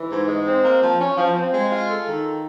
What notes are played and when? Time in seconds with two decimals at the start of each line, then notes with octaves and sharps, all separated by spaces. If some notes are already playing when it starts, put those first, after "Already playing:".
Already playing: E3
0.10 G#2
0.28 G#3
0.45 C4
0.63 A#3
0.81 F3
0.99 C#4
1.16 F3
1.35 C4
1.53 G#3
1.71 F4
1.89 A4
2.07 D#3